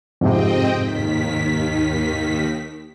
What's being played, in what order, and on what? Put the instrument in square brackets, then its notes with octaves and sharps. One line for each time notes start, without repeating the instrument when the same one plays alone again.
[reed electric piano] F2 G#2 C3 [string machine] C4 D#5 G5
[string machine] D#2 D#3 B6